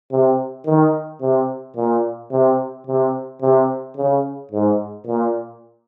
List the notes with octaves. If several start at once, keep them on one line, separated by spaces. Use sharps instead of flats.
C3
D#3
C3
A#2
C3
C3
C3
C#3
G#2
A#2